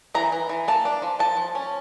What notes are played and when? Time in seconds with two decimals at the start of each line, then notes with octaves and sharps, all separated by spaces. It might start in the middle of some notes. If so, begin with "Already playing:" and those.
0.15 E3 A#5
0.32 E3
0.49 E3
0.68 A#3 A5
0.85 D4
1.02 F3
1.19 F3 A5
1.37 F3
1.55 C#4